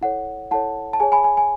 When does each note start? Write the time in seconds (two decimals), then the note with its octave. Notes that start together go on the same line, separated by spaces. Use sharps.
0.01 E4 A4 C#5 F#5
0.51 E4 A4 C#5 F#5 A5
0.93 A5
1.00 G#4 C#5 G#5
1.12 G#5 B5
1.24 G#5
1.37 G#5